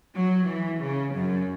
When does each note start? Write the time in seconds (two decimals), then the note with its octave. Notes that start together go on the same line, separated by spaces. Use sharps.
0.15 F#3
0.48 E3
0.81 C#3
1.15 F#2